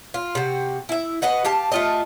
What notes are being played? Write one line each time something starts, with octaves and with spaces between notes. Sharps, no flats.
F4
C3 F#4
E4 E5
F#4 B4 D#5 F#5
G4 F5 A5
A3 F4 D#5